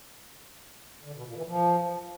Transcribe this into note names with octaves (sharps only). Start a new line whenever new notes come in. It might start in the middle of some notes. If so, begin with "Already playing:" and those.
D3
B2
A#2
E3
F3